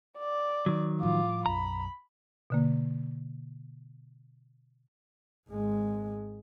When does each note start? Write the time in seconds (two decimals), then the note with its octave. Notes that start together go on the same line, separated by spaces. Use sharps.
0.19 D5
0.66 D#3 F#3
1.01 A2 F3 G3 F4 D6
1.46 B1 F#2 A#5 B5
2.50 B2 D3 A#3
5.50 G#1 G#3